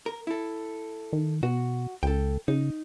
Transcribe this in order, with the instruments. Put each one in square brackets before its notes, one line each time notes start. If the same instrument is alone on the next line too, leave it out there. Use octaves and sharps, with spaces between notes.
[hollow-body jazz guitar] A#4
E4 A4
[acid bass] D#3
[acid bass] B2 [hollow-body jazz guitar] F#4
[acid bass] C#2 [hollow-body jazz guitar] A4 G5
[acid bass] C#3 [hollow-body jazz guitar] D#4